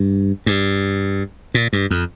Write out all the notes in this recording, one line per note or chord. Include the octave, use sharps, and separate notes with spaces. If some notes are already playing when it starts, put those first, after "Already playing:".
Already playing: G2
G2
A#2
G2
F2